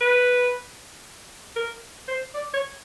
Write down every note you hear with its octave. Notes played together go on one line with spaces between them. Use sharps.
B4
A#4
C5
D5
C#5